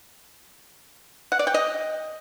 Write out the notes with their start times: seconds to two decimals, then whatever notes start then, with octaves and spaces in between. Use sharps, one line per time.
1.32 F#5
1.39 D5
1.47 G5
1.54 D#5